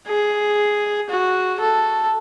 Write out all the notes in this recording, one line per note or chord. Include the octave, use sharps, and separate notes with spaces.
G#4
F#4
A4